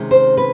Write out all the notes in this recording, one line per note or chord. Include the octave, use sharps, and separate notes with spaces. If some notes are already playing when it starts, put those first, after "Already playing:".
Already playing: C3 D#3 G#3 C#4
C5
B4